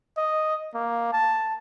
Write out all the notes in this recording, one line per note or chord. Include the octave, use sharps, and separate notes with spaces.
D#5
A#3
A5